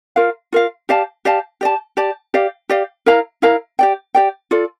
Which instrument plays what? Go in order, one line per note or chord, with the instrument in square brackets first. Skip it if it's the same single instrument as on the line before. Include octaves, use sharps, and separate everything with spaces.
[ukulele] F4 A#4 F5
F4 A#4 F5
G4 D5 F5 A5
G4 D5 F5 A5
G4 D5 A5
G4 D5 A5
G4 D5 F5
G4 D5 F5
E4 A#4 F5 A#5
E4 A#4 F5 A#5
G4 D5 G5
G4 D5 G5
F4 A4 D5